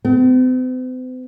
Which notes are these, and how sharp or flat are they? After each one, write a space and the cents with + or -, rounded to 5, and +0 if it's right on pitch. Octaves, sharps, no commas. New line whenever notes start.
C4 -45